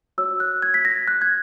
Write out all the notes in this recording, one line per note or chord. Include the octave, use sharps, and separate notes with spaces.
F#4 C#5 E6
F#6
G#6
B6
A#6
F#6
G#6